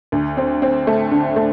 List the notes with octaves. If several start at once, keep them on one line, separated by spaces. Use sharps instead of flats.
D2
C4
C4
A3
D3
A3